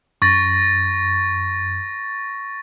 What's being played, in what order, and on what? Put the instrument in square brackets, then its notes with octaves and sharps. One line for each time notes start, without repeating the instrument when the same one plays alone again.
[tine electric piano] F#2 [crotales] C#6 A6 A#6